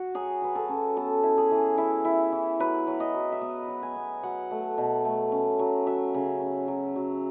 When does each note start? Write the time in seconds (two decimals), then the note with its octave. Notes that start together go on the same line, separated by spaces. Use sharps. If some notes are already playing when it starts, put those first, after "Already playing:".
Already playing: F#4
0.14 F#3 G#4
0.42 F#3 B4
0.55 A4
0.69 C#4
0.97 B3 A4
1.23 E4
1.37 G#4
1.51 E3
1.78 E4
2.05 E4
2.32 E3
2.59 F#3 B4
2.87 F#3
3.00 D#5
3.14 F#3
3.32 E5
3.41 B3 D#5
3.68 F#3
3.83 G#5
3.96 B3
4.23 F#3 F#5
4.51 A3
4.78 B2
5.05 A3
5.32 C#4
5.59 F#3
5.86 F#3 E5
6.14 C#3
6.41 C#4
6.68 F#3
6.96 F#3